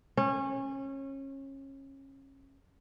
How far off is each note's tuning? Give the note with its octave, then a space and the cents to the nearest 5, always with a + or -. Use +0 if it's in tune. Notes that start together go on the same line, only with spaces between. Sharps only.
C#4 -25